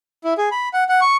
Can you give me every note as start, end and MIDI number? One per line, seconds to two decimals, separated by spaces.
0.24 0.34 64
0.38 0.49 68
0.52 0.69 83
0.74 0.84 78
0.89 1.00 78
1.01 1.17 85